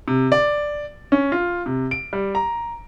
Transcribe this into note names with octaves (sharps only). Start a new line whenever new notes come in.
C3
D5
C#4
F4
C3
D7
G3
A#5